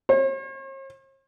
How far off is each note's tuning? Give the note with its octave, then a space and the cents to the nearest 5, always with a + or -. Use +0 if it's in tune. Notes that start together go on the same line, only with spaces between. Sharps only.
C#5 -45